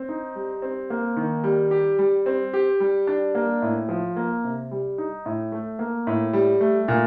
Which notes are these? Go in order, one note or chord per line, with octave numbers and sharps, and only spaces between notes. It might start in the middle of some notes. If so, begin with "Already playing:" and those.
Already playing: C4
D#4
G3
C4
A#3
D#3
G3
G4
G3
C4
G4
G3
D4
A#3
A2
F3
A#3
C3
G3
D#4
A2
A3
A#3
A2
G3
A3
A#2